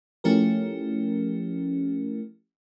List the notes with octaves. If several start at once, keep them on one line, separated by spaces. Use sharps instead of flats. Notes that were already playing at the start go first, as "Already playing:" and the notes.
F3 A3 C#4 E4 G4 A#4